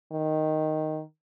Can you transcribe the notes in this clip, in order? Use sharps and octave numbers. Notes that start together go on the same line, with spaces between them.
D#3